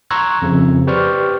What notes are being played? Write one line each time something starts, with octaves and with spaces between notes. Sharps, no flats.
A#5 C6 C#6 E6 F#6 G#6
F2 C#3 F3
G4 B4 C5 D5 C#6 F6